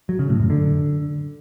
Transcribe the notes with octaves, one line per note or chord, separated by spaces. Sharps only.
F#3
C#3
A2
F#2
D3